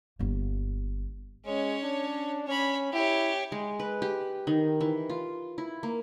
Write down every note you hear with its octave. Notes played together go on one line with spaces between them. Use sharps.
G1 A#3
G#3 C#4 C#5
D4
C#4 C#5 B5
E4 G4 C#5
G#3
B4
G4
D#3
E3
F4
E4
A#3